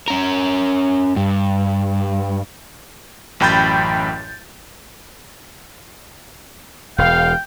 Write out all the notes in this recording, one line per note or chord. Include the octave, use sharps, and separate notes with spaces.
C#4 A#4
G2
A1 F#2 G5 B5 G6 A6
E1 F5 G5